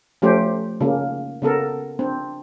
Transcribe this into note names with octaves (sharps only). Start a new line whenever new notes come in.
F3 A3 C#4 G4 C5
C#3 A#3
C#3 B3 A4 A#4
C4 D4